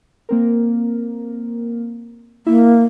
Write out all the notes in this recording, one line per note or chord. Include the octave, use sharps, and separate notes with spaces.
A#3 C4 A#4
A#3 E4 E5